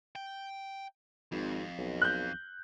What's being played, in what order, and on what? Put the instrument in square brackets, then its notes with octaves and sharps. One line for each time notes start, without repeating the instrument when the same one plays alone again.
[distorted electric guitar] G5
[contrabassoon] G#1 [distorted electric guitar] F2
[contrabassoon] B1
[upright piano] F#6 G6